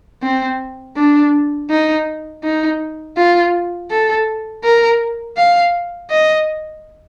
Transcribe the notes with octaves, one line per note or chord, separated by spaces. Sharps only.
C4
D4
D#4
D#4
F4
A4
A#4
F5
D#5